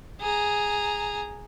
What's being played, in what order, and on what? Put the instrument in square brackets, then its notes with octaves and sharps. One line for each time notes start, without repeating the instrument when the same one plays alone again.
[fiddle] G#4 A#5